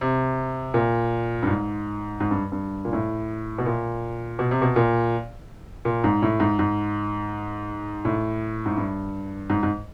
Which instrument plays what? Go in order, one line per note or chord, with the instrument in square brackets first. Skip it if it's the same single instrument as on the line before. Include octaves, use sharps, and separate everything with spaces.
[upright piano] C3
A#2
G2
G#2
G#2
G2
G2
A#2
A2
B2
A#2
B2
C3
B2
A#2
A#2
G#2
A2
G#2
G#2
A2
G#2
G2
G#2
G#2